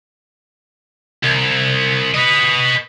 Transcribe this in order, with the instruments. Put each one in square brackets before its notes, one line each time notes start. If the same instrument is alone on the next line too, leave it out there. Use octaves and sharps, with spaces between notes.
[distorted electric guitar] C2
B4 D#5